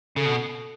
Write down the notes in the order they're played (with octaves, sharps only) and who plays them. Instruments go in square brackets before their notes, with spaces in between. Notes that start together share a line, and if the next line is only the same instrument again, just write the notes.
[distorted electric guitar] C#3 [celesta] A4
[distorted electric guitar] B2